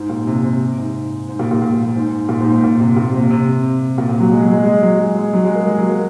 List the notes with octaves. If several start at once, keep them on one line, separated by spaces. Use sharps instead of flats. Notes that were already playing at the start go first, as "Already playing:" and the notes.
Already playing: G#2
A#2
C3
C3
G#2
G#2
A#2
A#2
A#2
G#2
A#2
G#2
G#2
A#2
C3
A#2
C3
C3
A#2
A#2
F#3
G#3
F#3
G#3
G#3
F#3
G#3
G#3
F#3
G#3
A#3
G#3
F#3
A#3